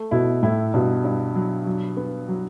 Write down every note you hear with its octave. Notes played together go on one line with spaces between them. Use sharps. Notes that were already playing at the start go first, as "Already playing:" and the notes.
Already playing: A3
B2 E4
A2 E4
G2 B2
G2
F#3
F#3
B3
F#3